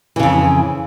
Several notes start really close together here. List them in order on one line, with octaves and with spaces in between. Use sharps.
E3 C#3 F2